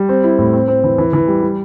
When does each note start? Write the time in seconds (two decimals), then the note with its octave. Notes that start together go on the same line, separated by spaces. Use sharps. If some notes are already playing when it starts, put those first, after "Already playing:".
Already playing: G3
0.09 C4
0.24 E4
0.38 A2
0.53 C4
0.68 C4
0.84 E3
0.98 E3
1.13 E3
1.28 G3
1.42 G3